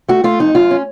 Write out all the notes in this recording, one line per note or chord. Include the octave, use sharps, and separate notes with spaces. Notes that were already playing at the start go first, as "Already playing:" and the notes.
A3 F#4
A3 F4
F2 D#4
F#2 F4
C#4